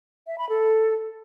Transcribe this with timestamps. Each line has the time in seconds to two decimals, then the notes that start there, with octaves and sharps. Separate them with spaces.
0.27 E5
0.38 B5
0.49 A4